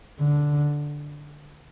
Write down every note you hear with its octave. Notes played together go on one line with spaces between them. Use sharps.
D3